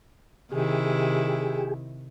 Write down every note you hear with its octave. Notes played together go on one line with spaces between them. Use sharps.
C3 D#3 E4 G4 G#4